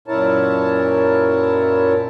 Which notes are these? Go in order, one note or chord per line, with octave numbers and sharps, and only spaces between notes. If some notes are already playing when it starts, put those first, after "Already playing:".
F#2 A#2 E4 A#4 C#5 A5